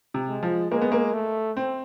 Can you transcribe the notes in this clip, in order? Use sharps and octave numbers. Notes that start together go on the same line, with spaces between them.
C3
G#3
F3
G#3 A#3
B3
A#3
A3
C4